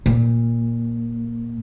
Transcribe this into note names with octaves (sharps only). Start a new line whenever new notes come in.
A#2